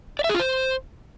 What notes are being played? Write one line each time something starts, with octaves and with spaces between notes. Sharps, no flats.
D5
E5
G#4
F4
C5